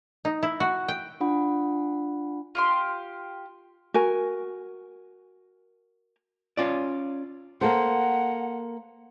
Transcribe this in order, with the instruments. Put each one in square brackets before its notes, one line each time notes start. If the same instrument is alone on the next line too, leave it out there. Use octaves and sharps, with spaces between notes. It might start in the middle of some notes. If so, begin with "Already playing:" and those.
[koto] D#4
E4
F#4
G5
[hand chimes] D4 F4 F#5 B5
[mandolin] F4 G4 C6
[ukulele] F#4 A#4 G#5
[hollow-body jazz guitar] C#4 F4 D5
[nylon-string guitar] A#3 A4 C5 [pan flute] F#5